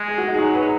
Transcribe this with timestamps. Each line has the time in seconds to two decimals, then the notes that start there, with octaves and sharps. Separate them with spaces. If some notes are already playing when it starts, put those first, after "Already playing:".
Already playing: G#3
0.08 G#4
0.18 F#4
0.28 D#4
0.34 G#4
0.39 F#3 F#4
0.54 F#3 B4